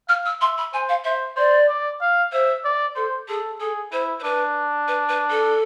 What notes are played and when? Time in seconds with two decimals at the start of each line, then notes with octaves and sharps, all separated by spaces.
0.09 F5 F6
0.26 E6
0.41 E5 C6
0.58 B5
0.74 C5 G#5
0.89 F5
1.05 C5 E5
1.36 C5 D5
1.69 D5
2.01 F5
2.32 C5 E5
2.65 D5
2.96 A4 C5
3.28 G#4 A4
3.60 G#4 A4
3.92 E4 C5
4.20 C5
4.24 D4 B4
4.88 B4
5.09 B4
5.30 A4